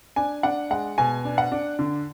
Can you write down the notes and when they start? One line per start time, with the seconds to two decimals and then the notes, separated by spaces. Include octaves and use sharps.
0.16 D4 G#5
0.43 D4 F#5
0.71 G#3 F#5
0.98 B2 G#5
1.25 D4
1.38 F#5
1.52 D4
1.79 D3